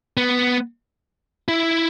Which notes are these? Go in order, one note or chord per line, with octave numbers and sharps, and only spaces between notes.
B3
E4